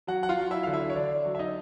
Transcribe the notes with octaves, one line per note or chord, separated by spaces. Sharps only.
F#3 F#4 F#5
F#5
F4 F5
F#3
E4 E5
D3 F5
E4 E5
C#5
D3 D4 D5
F#3
E5
D#4 D#5